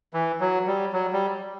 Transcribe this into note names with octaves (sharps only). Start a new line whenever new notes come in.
E3
F#3
G3
F#3
G3